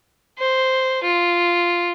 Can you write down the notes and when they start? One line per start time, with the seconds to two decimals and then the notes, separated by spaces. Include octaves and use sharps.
0.39 C5
1.04 F4